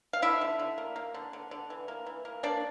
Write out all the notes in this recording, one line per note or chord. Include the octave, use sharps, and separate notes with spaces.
F5
D3 E4 E5
D3
D3
A#3
A#3
D3
D3
D3
E3
A#3
E3
A#3
A#3 D4 D5